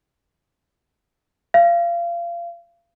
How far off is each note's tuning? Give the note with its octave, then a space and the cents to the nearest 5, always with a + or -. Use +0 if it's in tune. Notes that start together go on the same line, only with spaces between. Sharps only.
F5 -30